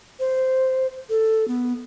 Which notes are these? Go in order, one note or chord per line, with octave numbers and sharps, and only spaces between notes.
C5
A4
B3